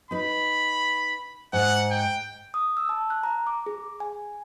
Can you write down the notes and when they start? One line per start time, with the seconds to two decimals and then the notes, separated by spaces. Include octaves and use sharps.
0.11 D#4 B4 B5
1.53 G#2 F#5
1.91 G5
2.54 D#6
2.77 E6
2.89 A5
3.10 F#6
3.23 A#5
3.47 D6
3.66 G#4
4.00 G#5